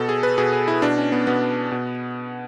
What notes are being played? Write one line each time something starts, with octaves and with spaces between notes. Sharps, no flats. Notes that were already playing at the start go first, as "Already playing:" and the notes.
Already playing: B2 A4
G#4
B4
B2 G#4
G#4
E4
B2 D4
C#4
B3
B2 B3
B2